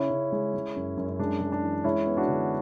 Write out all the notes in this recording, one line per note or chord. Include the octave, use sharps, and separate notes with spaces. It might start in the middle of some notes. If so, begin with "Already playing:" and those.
Already playing: C#3 C#4 E4
C#3
G#3
G#3
F#2
F#2
C#4
G#3 D4
G#3
D4
E3
G#3 C#4 E4
B3
D4 F#4
D3